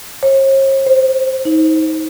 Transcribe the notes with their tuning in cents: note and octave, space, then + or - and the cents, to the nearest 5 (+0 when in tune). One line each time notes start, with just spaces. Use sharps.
C#5 -45
C5 +0
D#4 +30